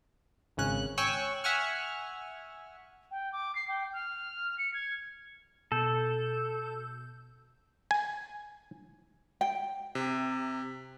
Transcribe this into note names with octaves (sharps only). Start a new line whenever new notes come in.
G#1 C#3 C#4 F#6
C#5 G5 G#5 C#6 E6 F#6
E5 F#5 G#5 C#6 F6
G5
D6
C7
G5
F6
C#7
G#6
B2 A4 G6
G#5
G5
C3